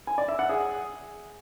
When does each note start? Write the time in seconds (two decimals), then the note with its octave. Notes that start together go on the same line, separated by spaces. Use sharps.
0.07 G#5
0.18 D5
0.28 E5
0.39 F#5
0.49 G#4